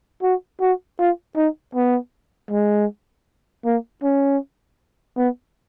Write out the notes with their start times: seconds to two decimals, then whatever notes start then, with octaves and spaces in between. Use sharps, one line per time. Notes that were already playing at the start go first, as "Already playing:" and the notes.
0.23 F#4
0.61 F#4
0.99 F4
1.37 D#4
1.75 B3
2.51 G#3
3.65 A#3
4.03 C#4
5.17 B3